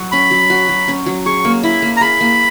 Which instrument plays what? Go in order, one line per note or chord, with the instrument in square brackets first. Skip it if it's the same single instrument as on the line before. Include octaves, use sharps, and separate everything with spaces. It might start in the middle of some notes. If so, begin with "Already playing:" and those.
Already playing: [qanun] F#3 F#4
[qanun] C#4 [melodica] B5
[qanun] F#3
F#4
F#3
C#4
F#3
[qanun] G#4 [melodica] C#6
[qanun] A#3
[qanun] E4 [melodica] B5
[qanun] A#3
[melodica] A#5
[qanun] G#4 [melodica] B5
[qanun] A#3